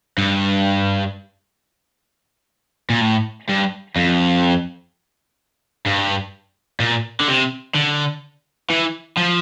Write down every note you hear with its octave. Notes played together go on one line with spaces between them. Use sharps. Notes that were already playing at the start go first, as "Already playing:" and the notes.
G2
A#2
A2
G2
F2
G2
A#2
D3
C3
D3
E3
F3